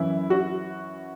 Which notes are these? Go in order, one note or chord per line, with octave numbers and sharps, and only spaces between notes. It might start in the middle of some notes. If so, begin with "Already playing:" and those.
Already playing: F#2 E3 E4
F#4